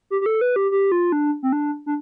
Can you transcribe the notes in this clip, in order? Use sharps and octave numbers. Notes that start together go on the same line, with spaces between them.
G4
G4
A4
B4
G4
G4
F4
D4
C4
D4
D4